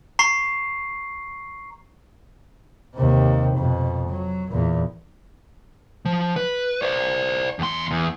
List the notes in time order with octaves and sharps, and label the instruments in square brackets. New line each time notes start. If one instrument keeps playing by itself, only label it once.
[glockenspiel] A#5 C#6 C7
[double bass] D#2 C3
F2 B2
F#3
E2 A#2
[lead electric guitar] F3
B4
C5 D5
E2 C6
E2